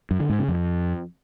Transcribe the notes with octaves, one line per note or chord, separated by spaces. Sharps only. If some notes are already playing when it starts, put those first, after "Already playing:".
F#2
D3
G#2
C#3
F2